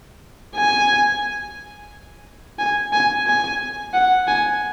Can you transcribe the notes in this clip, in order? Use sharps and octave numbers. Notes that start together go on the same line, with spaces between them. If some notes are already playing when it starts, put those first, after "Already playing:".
G#5
G#5
G#5
G#5
F#5
G#5